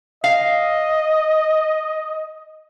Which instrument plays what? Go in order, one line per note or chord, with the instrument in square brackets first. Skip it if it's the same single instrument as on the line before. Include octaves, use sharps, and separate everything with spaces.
[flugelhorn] D#5 [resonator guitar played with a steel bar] F5